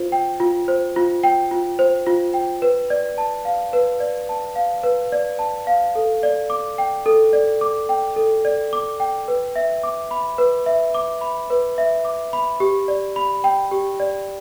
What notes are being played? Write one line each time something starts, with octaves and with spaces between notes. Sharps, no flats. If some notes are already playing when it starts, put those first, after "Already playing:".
Already playing: F4 C5
G5
F4
C5
F4
G5
F4
C5
F4
G5
B4
D5
A5
F5
B4
D5
A5
F5
B4
D5
A5
F5
A4
D5
D6
G5
A4
D5
D6
G5
A4
D5
D6
G5
B4
E5
D6
B5
B4
E5
D6
B5
B4
E5
D6
B5
G4
D5
B5
G5
G4
D5